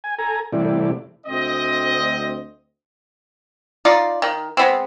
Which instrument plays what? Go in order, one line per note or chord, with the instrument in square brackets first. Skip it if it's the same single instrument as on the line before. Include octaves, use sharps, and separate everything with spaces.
[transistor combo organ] G#5
A4 G#5 A#5
C3 E3 G3 A3 E4 D5
[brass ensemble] D2 C4 D#5
[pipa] D#4 F4 D5
D#3
G#3 B3 C4